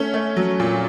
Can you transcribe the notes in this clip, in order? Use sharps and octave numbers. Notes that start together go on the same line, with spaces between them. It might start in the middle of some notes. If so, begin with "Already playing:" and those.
Already playing: A3 C#4
A3
F#3
A#2